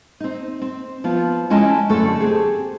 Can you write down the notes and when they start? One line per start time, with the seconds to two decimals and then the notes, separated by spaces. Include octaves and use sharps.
0.20 C4 D#4
0.62 C4
1.04 F3 B3 F4
1.50 G#3 C#4 E4 D#5 G5 A5
1.89 F#2 D3 A3 F#4 A4
2.20 C4 G4 G#4